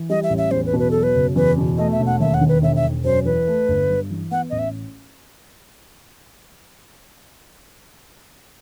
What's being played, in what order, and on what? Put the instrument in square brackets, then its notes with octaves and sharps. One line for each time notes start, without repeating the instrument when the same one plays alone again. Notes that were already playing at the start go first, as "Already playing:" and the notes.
Already playing: [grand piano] E3
[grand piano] G3 [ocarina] D#5
[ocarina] E5
[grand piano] A1
[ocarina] E5
[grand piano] E2 [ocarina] C5
[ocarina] B4
[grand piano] B2
[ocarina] B4
[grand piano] F#3 [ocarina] A4
[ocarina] B4
[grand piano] F#1
[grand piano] E2 [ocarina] B4
[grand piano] B2
[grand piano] A3 [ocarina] D#5
[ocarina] E5
[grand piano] E1
[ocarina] F#5
[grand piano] D#2 [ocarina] E5
[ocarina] F#5
[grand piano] D#3
[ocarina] B4
[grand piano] E1 [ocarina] E5
[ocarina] E5
[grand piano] E1
[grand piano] F#2 [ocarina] C5
[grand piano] E3 [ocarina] B4
[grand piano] A3
G1
G2
E3
[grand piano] B3 [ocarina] F#5
[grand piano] A1 [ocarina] D#5
[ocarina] E5